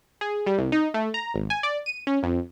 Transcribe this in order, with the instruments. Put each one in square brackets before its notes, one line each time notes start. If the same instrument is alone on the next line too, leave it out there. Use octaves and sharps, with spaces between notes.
[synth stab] G#4
G3
C2
D#4
A3
A#5
G#1
G#5
D5
D#7
C#4
F2